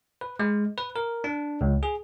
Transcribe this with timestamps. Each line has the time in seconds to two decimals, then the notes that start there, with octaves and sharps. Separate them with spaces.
0.21 B4
0.39 G#3
0.78 B4
0.96 A#4
1.24 D4
1.61 C#2
1.83 G#4